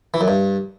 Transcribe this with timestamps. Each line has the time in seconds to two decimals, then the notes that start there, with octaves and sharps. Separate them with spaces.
0.14 E3
0.21 F#2
0.28 G2